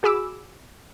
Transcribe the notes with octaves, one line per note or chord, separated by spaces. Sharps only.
F#4 G#4 B5 D6 E6